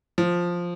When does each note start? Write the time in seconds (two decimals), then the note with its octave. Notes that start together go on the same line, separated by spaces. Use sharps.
0.18 F3